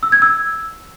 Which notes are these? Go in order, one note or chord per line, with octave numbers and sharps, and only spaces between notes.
E6
G#6
E6